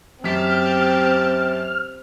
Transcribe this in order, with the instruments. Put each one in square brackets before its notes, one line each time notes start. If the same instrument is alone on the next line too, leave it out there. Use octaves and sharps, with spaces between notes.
[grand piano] F#2 B6 [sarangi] C4 [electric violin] G4 A5 [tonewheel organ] F6